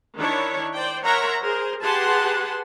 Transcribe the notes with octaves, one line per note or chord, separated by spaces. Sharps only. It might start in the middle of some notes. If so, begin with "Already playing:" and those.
D#3 D4 E4 C#5
C5 D5 G5
A#4 C#5 E5 F#5 A#5 C6
G#4 A#4 C5
G4 G#4 B4 F#5 A5 C6